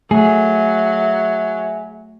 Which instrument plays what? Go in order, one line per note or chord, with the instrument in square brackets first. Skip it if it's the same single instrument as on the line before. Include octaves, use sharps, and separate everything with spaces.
[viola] F#3 [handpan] A3 [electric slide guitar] G#4 [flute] E5